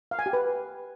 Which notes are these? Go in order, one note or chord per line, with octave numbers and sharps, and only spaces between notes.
F5
G#5
G4
B4